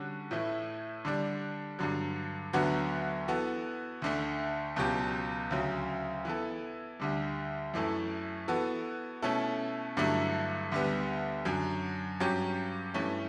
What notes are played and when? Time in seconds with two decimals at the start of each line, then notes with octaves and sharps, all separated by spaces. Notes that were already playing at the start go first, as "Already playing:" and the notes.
Already playing: D3 G3 C#4 F#4
0.31 A2 E3 A3 E4
1.05 D3 G3 D4
1.79 G2 D3 F#3
2.53 D2 D3 F#3 B3 F#4
3.28 E3 B3 F#4 A4
4.02 D2 D3 A3
4.76 C#2 B2 F#3 C#4 G4
5.51 D2 C#3 F#3
6.25 E3 B3 E4 A4
7.00 D2 D3 G3
7.74 F#2 E3 A3 E4 A4
8.48 E3 B3 F#4 A4
9.22 B2 A3 C#4 E4 A4
9.97 G2 D3 F#3 A3 E4
10.72 D2 D3 G3 B3
11.45 F#2 D3 F#3
12.20 G2 F#3 C#4 G4
12.94 G2 E3 A3 C#4